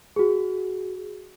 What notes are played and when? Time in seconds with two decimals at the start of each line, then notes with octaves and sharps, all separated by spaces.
0.16 F#4 G#4